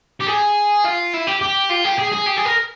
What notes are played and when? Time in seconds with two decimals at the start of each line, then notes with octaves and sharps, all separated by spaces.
0.21 G4
0.28 G#4
0.85 F4
1.14 E4
1.27 G4
1.41 G4
1.70 F4
1.85 G4
1.99 G#4
2.12 G#4
2.27 G4
2.37 G#4
2.45 A#4